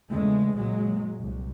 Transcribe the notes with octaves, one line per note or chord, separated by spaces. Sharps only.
E2 C#3 G#3 A3
F#1 A#2 F#3 G#3
C2